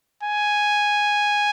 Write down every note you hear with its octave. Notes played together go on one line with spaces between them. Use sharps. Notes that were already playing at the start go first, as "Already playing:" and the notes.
G#5